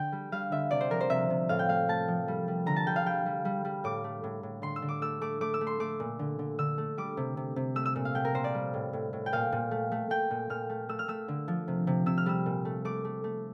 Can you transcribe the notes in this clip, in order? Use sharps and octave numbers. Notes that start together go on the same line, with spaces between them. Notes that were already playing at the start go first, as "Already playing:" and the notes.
Already playing: D3 G5
G3
G3 F5
D3 E5
C3 D5
C5
F3 A#4
C5
C3 E5
C3
A2 F5
G5
A3 F5
A3 A5
F3
G3
G3
D3 A#5
A5
G3 G5
F5
G3 G5
G3
G3
G3
A2 D6
A3
A2
A2
D3 C6
E6
D3
D6
A3 E6
A3 D6
A3 D6
E6
A3
C6
A3 D6
A#2
D3
D3
D3 E6
A3
G3 D6
C3
C3
C3
A3 E6
E6
A#2 E6
F5
A3 G5
A#4
A#2 C5
D5
G3
A2
A2
A2
G5
A#2 F5
A#2
A3
A3
A3 G5
A#2
A#2 F6
A3
A3 E6
F6
A3 E6
D3
F3
C3
C3
C3 E6
F6
G3 E6
A#2
A3
A3 D6
A3
A3